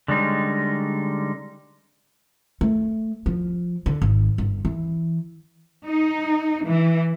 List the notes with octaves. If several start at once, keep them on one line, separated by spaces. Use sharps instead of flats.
D3 G3 G#3 C#4 D#4
A3
F3
D3
G#1
G1
E3
D#4
E3